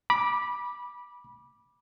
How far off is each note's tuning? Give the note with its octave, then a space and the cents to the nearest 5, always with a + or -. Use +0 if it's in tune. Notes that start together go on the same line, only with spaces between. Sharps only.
B5 -20 D6 +0